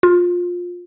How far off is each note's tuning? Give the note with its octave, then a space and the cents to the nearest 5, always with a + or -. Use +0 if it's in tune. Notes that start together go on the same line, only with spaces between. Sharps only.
F4 +20